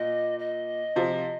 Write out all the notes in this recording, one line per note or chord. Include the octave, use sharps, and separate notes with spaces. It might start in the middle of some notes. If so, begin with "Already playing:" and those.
Already playing: A#2 D#5
D#5
C3 F3